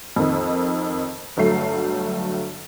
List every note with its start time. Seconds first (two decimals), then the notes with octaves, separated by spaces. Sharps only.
0.16 F2 D#3
1.37 G1 F#3 A3 C7